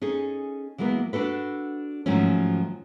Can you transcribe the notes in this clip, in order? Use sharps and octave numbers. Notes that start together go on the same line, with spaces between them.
C#4 D#4 G#4 A4
E3 F#3 G#3 A#3 B3
D4 F#4 A4 B4
G#2 D#3 F3 F#3 A3 C#4